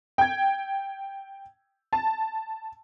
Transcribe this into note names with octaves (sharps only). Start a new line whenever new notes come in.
G5 G#6
A5